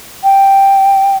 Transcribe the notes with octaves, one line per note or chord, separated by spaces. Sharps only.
G5